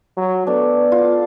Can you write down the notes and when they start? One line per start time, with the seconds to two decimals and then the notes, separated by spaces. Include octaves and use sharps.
0.17 F#3
0.47 A3 B3 D4
0.92 F4